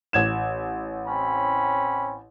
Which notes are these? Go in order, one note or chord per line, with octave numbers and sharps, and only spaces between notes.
A1 G#6 E7
C4 C#4 B5